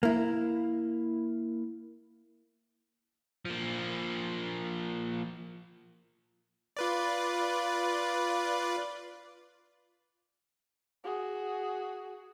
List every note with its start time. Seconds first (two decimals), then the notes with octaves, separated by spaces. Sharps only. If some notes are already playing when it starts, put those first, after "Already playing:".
0.03 A#3 E4
3.45 F3 A#3
6.77 F4 B4 D5
11.04 F#4 G#4